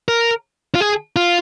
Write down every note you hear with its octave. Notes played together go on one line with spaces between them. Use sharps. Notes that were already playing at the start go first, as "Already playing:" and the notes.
A#4
F4
G#4
F4